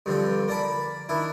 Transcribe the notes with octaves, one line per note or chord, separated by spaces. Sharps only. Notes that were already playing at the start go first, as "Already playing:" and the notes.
G2 D3 F3 C4
A#3 D5 A5 B5
D#3 D4 E4